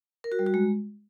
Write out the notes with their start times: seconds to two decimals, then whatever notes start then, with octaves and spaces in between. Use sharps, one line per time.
0.24 A#4
0.32 F#4
0.39 G3
0.46 F#4
0.54 G#3